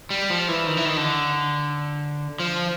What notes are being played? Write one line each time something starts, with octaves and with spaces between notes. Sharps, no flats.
G3
F3
E3
D#3
E3
D#3
D3
F3